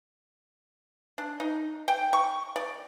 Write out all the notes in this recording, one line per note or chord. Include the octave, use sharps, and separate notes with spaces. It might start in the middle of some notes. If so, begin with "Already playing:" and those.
D4
D#4
G5
C#6
D5